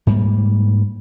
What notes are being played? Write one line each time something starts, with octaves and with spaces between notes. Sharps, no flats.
G#2 G3 G#3 A#3